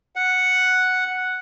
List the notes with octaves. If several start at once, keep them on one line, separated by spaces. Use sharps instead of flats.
F#5